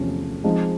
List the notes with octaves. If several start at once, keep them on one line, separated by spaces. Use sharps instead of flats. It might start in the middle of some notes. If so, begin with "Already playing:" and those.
Already playing: E2 C3 F3 A3 C#4
F3 G#3 C4 D#4